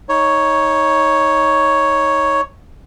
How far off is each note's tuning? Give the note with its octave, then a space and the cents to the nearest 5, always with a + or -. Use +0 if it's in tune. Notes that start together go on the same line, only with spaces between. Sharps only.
D#4 +20 C#5 +0